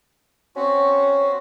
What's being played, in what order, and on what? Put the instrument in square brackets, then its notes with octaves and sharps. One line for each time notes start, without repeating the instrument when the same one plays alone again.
[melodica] C4 F#4 [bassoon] C#4